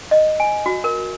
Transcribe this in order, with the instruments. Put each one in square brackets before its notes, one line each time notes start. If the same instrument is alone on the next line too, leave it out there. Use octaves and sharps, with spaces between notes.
[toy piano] D#5
G#5
F#4
A#4